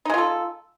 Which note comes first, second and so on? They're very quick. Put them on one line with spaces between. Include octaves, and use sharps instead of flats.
D#4 G#3 F4 A4